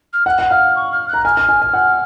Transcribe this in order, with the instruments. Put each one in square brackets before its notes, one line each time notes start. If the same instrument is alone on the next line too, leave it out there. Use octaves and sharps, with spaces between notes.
[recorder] F6
[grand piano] F#5 [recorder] F#6
[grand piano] F#5
[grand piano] F5 [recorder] F6
[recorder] C#6
F6
F#6
[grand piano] A#5
[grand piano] G#5 [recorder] F6
[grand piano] G#5
G#5
G#5
F#5